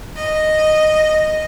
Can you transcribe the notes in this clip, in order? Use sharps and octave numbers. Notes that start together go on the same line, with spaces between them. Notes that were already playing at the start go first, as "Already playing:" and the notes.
D#5